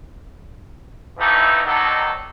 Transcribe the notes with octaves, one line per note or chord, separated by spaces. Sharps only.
F2 B2 E3 A3 D#4 A4
B2 D#3 F#3 D4 D#4 A4